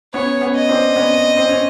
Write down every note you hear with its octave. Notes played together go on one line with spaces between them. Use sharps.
B3 C#4 C#5
B3 C#4
D#5
C4 D4
B3 C#4
C4
C#4